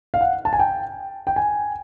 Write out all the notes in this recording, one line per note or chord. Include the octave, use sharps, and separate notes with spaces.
F5
F#5
A5
G#5
G5
G5
G#5